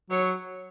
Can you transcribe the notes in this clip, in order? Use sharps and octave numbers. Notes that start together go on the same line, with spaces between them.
F#3 C#5